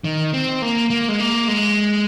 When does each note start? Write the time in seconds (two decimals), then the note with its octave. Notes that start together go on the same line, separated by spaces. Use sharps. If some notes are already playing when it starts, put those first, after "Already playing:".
0.04 D#3
0.33 C4
0.62 A#3
0.90 A#3
1.08 G#3
1.20 A#3
1.48 G#3